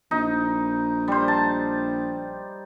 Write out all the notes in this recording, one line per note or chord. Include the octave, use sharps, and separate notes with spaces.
A#1 D#4
G3 C5
A5